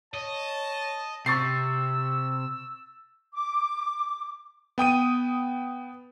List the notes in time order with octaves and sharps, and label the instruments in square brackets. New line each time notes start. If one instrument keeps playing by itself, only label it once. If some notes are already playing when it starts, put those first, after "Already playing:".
[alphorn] C#5 [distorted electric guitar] D#5 [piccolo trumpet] A5
[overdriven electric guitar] C3 [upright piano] C#6 A6 C7 [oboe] E6
[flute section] D6
[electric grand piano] B3 G5 D#6 D#7